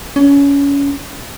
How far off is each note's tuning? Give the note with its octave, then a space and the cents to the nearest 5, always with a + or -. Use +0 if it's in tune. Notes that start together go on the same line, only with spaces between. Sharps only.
C#4 +25